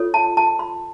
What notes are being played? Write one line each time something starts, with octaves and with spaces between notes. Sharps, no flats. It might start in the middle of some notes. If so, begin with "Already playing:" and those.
Already playing: F4 A4 C#5
A5
A5
B5